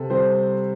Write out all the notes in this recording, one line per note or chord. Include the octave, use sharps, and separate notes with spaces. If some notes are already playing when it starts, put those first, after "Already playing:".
Already playing: C3 A4
G3 C4 C5